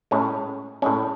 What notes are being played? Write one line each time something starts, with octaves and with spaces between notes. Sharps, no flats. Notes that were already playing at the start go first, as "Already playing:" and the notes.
A2 G#3 C#4
A2 G#3 C#4